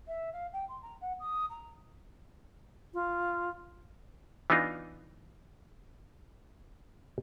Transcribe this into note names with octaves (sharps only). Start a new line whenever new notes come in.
E5
F5
G5
C6
A#5
F#5
D#6
A#5
F4
E3 B3 D4 D#4 F4